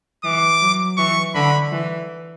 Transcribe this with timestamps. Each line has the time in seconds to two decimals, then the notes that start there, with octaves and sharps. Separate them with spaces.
0.24 E3 D6
0.61 F#3
0.98 E3 C#6
1.35 D3 B5
1.72 E3